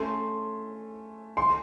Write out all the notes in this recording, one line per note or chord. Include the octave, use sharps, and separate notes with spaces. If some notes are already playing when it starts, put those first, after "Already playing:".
Already playing: A3 C#4 A4 C6
C6